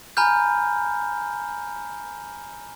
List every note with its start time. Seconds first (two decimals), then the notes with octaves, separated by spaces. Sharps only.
0.17 G#5 A#5 B5 F6 G6